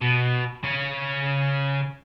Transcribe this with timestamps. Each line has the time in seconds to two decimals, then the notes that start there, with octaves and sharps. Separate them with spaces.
0.01 B2
0.63 C#3 C#4